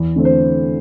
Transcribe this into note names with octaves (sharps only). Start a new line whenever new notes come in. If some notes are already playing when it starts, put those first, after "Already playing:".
Already playing: E2
D3 A3 C4
C5